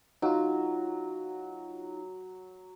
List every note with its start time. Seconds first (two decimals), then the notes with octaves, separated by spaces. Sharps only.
0.22 F#3 D#4 F4